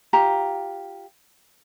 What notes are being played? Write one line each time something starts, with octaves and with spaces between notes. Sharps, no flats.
F4 G4 A#5